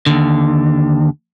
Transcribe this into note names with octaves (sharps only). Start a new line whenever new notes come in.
D#2 D3